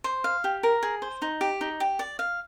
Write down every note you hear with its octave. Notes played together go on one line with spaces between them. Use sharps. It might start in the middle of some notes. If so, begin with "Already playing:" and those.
C5
F5
G4
A#4
G#4
C5
D#4
G4
D#4
G4
D5
F5